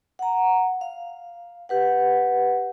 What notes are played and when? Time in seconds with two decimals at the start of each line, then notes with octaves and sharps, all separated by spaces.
0.19 F#5 A#5
0.81 F5
1.69 G4 B4 F#5